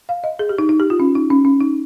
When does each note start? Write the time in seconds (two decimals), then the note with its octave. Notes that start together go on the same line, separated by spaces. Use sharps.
0.09 F5
0.24 D#5
0.39 G#4
0.49 G4
0.58 D#4
0.69 D#4
0.80 G4
0.90 F4
1.00 C#4
1.15 D#4
1.30 C#4
1.45 C#4
1.61 D#4